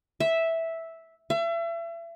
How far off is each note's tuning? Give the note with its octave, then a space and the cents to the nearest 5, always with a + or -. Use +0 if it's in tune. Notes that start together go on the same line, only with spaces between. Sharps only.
E5 -5
E5 +35